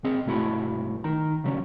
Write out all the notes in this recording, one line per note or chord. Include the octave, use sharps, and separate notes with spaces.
C4 G#4 D#5
B1 G2 A3 E4 F#4 B5
D#3 D#4 A#5
C#3 F#3 G#3 B3 C#4 D4